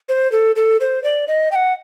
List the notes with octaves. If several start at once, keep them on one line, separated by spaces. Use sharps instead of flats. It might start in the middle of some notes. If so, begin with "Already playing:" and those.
C5
A4
A4
C5
D5
D#5
G5
F#5